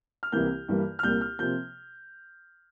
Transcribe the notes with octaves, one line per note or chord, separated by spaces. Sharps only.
F6
C2 C3 E3 A#3 G6
G2 E3 G3 A#3
F6
C2 A#2 G3 A#3 G6
F6
C3 F3 A#3 G6